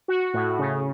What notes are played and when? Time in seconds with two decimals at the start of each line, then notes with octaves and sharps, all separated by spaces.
0.08 F#4
0.34 A2
0.59 C#3